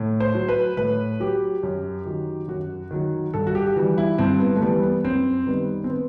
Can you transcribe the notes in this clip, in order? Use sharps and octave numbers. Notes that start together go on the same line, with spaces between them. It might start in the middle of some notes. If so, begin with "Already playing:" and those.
Already playing: A2
C5
F#3
B4
A2 B4
F#3 G4
F#2
D#3 F#3
F#2 F#4
D#3 F#3
G2 A4
F#4
G4
G4
E3 G3 F#4
E4
G2 C4
B3
A3
E3 G3 B3
B3
F#2 C4
D#3 G3 B3
C4
B3